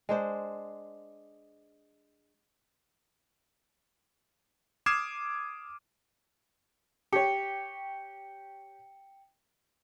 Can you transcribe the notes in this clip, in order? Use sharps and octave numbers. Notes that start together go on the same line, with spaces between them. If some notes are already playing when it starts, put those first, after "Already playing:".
G#3 D4 C5
D6 D#6 F6 G#6 C7 E7
G4 C#5 G5 C#7